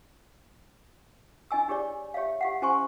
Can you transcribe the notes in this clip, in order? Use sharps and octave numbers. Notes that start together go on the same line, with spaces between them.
D4 D#5 G#5 E6
D4 G4 G#4 C#5 D5
G4 C#5 E5 F5
G4 F5 F#5
C#4 G4 C5 G#5 C6 C#6